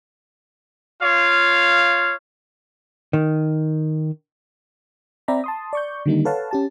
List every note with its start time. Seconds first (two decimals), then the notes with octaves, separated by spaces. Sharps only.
1.01 F4 C#5 F5
3.13 D#3
5.28 C4 D5 E5 G5 A#5 B5
5.44 A5 C6 D#6
5.73 D5 C#6 G6
6.06 D3 D#3 G3 A#3 D#4
6.25 A4 B4 C#5 F5 F#5 A5
6.51 C#4 G4 A5